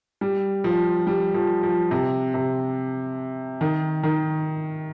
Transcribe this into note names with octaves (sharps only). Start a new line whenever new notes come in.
G3
F3
G3
F3
F3
C3
C3
D#3
D#3